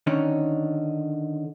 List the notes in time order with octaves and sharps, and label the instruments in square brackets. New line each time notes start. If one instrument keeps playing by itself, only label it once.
[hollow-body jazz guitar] D3 D#3 C#4 D#4